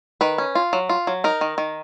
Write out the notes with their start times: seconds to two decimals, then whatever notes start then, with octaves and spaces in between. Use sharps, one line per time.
0.21 D#3 B4
0.38 C#4
0.55 F4
0.73 F#3
0.89 F4
1.07 F#3
1.24 D#4 A#4
1.41 D#3
1.58 D#3